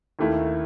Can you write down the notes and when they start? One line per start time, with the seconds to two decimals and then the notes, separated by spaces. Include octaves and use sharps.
0.19 D#2 D#3 A3 E4